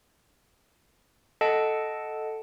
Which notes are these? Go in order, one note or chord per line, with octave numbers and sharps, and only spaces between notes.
A4 D#5 F#5 A5 D7